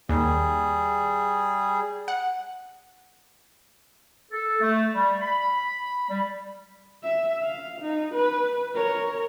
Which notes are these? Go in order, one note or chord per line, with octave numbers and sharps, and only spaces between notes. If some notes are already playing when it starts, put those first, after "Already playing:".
D#2 G3 G#4
F#5
A4
A3
G3
B5
G3
E5
F5
D#4
B4
A#4 C#5